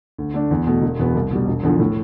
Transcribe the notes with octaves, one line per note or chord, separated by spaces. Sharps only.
D2
D3 A3 D4
E2
B2 A3
E1
E2 B2 B3
C2
B2 G3
E1
E2 D3 F3
A2